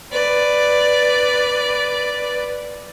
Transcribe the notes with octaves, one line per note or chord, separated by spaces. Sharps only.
B4 D5